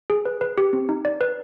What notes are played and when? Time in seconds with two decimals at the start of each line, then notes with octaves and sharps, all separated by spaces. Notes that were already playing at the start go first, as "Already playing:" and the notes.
0.10 G#4
0.25 B4
0.41 B4
0.58 G4
0.73 C4
0.89 D#4
1.05 D5
1.21 B4